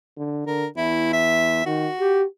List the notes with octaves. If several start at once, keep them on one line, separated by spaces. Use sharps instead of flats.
D3
D3 A#4
E2 E4
E5
D#3 F#4
G4